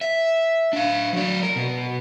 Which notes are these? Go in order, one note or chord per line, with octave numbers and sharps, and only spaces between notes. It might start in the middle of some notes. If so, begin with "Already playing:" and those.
E5
D4 F5
F#3 D5
A#4
B2